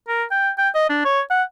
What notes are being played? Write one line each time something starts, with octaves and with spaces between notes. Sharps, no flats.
A#4
G5
G5
D#5
D4
C#5
F#5